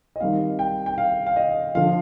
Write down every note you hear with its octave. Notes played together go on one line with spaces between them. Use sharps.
D#5
D#3 G3 C4 D#4 F5
G5
G5
F5
F5
D#5
D3 F3 F5